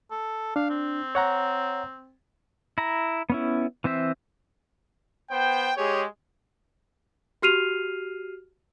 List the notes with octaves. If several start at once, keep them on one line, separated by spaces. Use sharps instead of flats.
A4
D4 F5
C4
C#5 F#5 A#5
E4 A#5
B3 C#4 E4
E3 C4 C5 E5
B3 C5 G5
G#3 G4 G#4 C#5
F#4 G4 F6 C7 D#7 F7